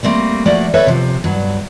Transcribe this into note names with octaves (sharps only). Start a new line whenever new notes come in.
G3 A3 A#3 C4
F3 A3 A#3 F#4 D5
A4 B4 C#5 E5
C3 F3
G2 F#3